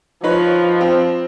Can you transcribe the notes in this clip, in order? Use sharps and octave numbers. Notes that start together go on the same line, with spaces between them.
F3 D#4 B4 C#5
C4